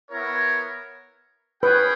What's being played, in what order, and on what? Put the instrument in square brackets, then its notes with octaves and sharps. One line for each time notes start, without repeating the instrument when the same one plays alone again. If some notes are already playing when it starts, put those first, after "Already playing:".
[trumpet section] B3 E4 A#4 C#5
[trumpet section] C#4 G#4 C#5 G5 [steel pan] B4